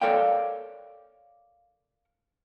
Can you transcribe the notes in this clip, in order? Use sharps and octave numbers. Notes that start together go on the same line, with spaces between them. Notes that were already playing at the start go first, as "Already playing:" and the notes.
A4 A#4 C#5 D5 F5 G5